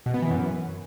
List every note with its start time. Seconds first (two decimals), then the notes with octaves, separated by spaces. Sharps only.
0.06 B2
0.14 B3
0.22 E3
0.30 F#2